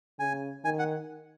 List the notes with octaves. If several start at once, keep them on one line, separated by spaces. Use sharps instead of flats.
C#3 G#5
D#3 G#5
F#5